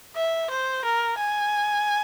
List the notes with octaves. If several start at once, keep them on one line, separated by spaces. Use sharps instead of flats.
E5
C5
A#4
G#5